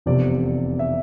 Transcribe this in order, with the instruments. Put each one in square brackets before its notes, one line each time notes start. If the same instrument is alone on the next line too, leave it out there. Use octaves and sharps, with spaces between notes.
[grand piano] F1 E2 C3 F3 D5
E5